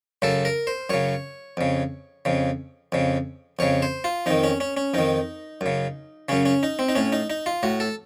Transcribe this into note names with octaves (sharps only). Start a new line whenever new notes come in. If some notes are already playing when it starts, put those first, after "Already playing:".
F#2 C#3 A4
A#4
C5
F#2 C#3 C#5
F2 C#3
F2 C#3
F2 C#3
F2 C#3 C#5
C5
F4
F2 D#3 D#4
C#4
C#4
C#4
F2 D#3 D#4
F#2 C#3
F#2 C#3 C#4
C#4
D#4
C4
D#4
A2 C#4
D#4
D#4
F4
A2 F#4
A4